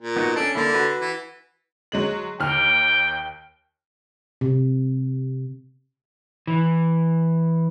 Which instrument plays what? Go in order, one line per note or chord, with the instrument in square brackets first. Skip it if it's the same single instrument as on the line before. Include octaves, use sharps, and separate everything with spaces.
[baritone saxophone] A#2
[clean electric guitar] B3 D#4 F#4
[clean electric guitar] C#4 A4 [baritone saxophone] D4
[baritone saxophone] D3 [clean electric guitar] A#3 E4
[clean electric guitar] F#4 B4
[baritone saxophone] E3
[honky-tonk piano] F#3 G#3 F#7
[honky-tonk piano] D#2 F6 [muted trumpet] G5
[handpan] C3
[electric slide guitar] E3